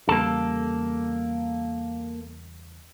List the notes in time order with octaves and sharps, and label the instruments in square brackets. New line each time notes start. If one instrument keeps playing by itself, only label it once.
[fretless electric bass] E2 C#3 G3 [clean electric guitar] A#3 A4